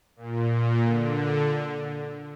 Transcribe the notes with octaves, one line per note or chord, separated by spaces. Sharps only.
A#2
A#2
D3